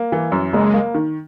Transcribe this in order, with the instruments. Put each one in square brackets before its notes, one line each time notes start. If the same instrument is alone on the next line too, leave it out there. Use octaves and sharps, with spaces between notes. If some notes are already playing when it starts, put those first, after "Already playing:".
Already playing: [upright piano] A#3
E3
F#2
[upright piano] F#1 [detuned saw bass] G#3
[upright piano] A#3
D#3